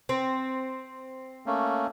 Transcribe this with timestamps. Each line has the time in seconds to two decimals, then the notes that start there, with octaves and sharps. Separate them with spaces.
0.09 C4
1.46 A3 A#3 C#4